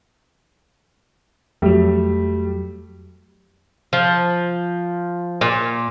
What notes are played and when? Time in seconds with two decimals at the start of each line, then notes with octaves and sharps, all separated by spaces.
1.62 F2 F#3 G3 A3
3.93 F3
5.41 A#2